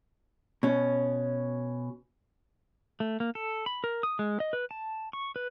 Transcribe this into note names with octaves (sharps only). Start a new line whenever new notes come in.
B2 C#4
A3
A#3
A4
B5
A#4
D#6
G#3
D#5
B4
A5
C#6
B4